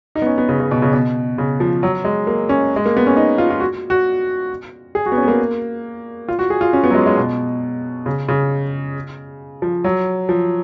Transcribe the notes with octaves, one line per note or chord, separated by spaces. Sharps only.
D#4
B3
C#4
B3
C#3
C#3
B2
C#3
B2
C#3
F3
F#3
G#3
A#3
C#4
G#3
A#3
B3
C#4
D#4
F4
F4
F#4
F#4
G#4
F#4
B3
C#4
B3
A#3
F4
F#4
G#4
F4
C#4
B3
F#3
G#3
G#3
B2
C#3
C#3
F3
F#3
F3